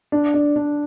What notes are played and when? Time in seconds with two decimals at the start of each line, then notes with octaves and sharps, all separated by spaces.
0.12 D4
0.34 D4
0.56 D4